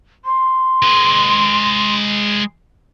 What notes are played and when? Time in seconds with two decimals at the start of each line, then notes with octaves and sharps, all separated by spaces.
0.25 C6
0.82 G#3 B4